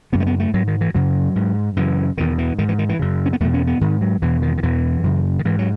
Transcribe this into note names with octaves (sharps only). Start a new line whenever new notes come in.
F#2 C#3 B3
A3
B3
A3
G#2 F#3
D#3
E3
F#2 C#3 F#3
G#2
F#2 C#3 E3
E2 B2 D#3
E3
G#2 D#3
E3
D#3
E3
F#2 C#3
C#4
B3
E2 B2 A3
C#4
B3
G#2 D#3
F#3
E2 B2 E3
D#3
D#3
E2 B2 E3
F#2 C#3
D#3
G#2 E3
F#3